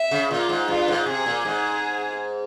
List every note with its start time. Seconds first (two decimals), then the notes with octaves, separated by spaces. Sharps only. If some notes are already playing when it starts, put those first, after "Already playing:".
Already playing: E5
0.11 C#3
0.31 A#2 F4
0.49 G#2
0.68 G2 F4
0.88 G#2
1.06 C3 G#4
1.26 A#2
1.45 G#2 G#4